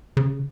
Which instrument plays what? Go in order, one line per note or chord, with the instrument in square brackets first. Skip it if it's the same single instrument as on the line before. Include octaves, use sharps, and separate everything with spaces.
[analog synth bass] C#3